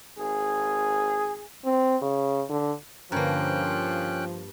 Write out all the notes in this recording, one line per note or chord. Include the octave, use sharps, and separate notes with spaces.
G#1 G#4
C4
C#3
D3
G2 D3 F3 A#3 C#4 A#4 G5 F#6